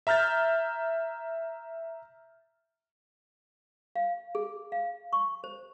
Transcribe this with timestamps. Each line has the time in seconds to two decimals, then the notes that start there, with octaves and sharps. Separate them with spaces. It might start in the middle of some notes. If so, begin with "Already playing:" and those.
0.07 E5 A#5 F6 G6 A6
3.96 F5
4.35 G#4
4.72 F5
5.13 C#6
5.44 C5